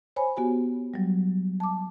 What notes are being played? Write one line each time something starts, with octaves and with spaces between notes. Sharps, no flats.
C5 C#5 G#5 B5
B3 F#4 G4 G#5
F#3 G3
A5 D6